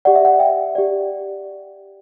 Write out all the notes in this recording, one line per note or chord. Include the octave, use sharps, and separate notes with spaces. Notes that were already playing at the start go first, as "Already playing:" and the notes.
G4 D5 F#5
E5
F#5
E5 G5
G4 D5